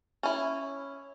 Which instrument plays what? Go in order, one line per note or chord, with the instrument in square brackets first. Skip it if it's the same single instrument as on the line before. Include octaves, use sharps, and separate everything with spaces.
[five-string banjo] C#4 E4